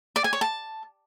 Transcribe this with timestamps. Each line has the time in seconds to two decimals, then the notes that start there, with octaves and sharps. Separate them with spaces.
0.16 D5
0.24 G#5
0.33 C#5
0.41 A5